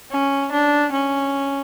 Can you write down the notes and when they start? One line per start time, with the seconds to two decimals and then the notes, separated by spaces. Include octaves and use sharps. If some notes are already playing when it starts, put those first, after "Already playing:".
0.12 C#4
0.52 D4
0.92 C#4